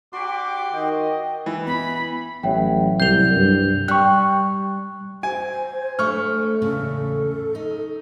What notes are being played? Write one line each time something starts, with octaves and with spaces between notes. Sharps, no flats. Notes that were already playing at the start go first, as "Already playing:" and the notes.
D4 F#4 G4 C6 D6
D#3 D#5 G5
E3
B3 E4 B5
A1 F#3 C#5 E5 G5
C2 C3 G6 C7 F7 G7
G2
G3 C#6 F#6
C5 G#5
A3 D4 C#6 F6
E2 A2 C#3 A4
D#4